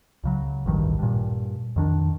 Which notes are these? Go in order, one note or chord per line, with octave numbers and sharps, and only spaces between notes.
C#2 C#3 F#3
A1 D2 G2 D#3
G2 A#2
F2 D#3 D4